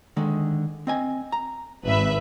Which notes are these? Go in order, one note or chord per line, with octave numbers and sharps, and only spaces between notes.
D3 D#3 G#3
C4 D#5 G#5
A#5
G#1 B4 E5